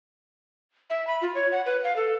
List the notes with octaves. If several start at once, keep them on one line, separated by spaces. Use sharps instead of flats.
E5
B5
F4
C#5
F#5
B4
F5
A4